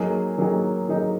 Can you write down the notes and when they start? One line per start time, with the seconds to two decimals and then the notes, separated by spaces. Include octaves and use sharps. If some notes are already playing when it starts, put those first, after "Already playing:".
Already playing: F#3 A#3 D#4 G#4
0.38 F#3 A#3 D#4 G#4
0.89 F#3 A#3 D#4 G#4